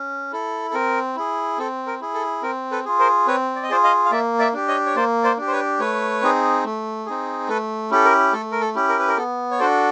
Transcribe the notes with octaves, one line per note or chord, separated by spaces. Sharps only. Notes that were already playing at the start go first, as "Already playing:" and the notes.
Already playing: C#4
E4 A4
A4
C4 A#4
E4 G#4
C4 A4
A#4
E4 G#4
A4
C4 A#4
A4 B4
F4 G#4
A#4 C5
C4 B4 C#5
D5
D#5
F4 G#4 C5 D5
D#5 F5
F5
A#3 D5 E5
D5 E5
D4 G4
C#5 D#5
C#5
A#3 C5 D5
C5 D5
D4 G4
C5
B4 C#5
A3 B4 C#5
C4 D#4 G#4
A3
C4 D#4 G#4
A3 A4 B4
C#4 E4 G4 A4
A#4
A3 A4
A#4
A4
C#4 E4 G4
A#4
B4
A#4
B3 A4
C#5
D4 F#4 A4 C5 D5